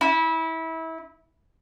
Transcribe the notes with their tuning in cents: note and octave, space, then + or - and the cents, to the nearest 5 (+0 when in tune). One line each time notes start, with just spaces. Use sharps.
E4 -25